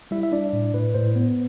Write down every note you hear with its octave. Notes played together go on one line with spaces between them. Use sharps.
G3 E4 E5
E5
D4 D5
A2
A2 B4
A2 C5
B3